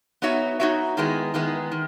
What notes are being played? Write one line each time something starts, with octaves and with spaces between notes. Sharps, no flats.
B3 D#4 F#4 C#5 E5
B3 D#4 F#4 C#5 E5
D#3 G#3 B3 E4 G#4
D#3 G#3 B3 E4 G#4
D#3